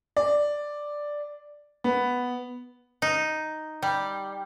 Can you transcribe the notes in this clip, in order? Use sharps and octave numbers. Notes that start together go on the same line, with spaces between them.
D5
B3
D#4
G3